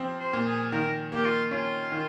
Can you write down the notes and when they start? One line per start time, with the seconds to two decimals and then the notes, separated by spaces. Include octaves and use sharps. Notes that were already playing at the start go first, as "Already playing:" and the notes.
Already playing: F3 C4
0.20 C5
0.33 A#2
0.46 G#4
0.72 D#3 A#4
1.12 A#3 G4
1.25 F4
1.51 C#4 F4
1.92 D#3